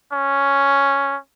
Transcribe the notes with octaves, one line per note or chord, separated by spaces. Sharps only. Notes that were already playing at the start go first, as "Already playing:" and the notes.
C#4